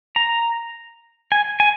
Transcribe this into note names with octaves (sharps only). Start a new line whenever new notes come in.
A#5
G#5
G#5